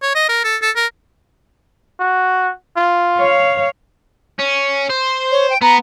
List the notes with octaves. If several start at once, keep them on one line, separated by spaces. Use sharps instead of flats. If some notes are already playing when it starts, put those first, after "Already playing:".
C#5
D#5
A#4
A4
A4
A#4
F#4
F4
C#5 F5
C#4
C5
C#5
G5
B3 A#5